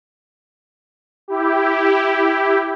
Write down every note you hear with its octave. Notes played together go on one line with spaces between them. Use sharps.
E4 G4